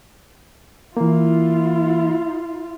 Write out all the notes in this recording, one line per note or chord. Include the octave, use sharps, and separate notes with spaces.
E3 A#3 E4 F4